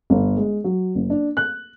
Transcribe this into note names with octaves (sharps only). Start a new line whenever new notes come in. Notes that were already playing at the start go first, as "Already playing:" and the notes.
G1
G#3
F#3
F#1
D4
F#6